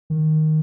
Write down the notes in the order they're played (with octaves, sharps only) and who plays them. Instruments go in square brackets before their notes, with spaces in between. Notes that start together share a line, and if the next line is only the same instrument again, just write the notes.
[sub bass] D#3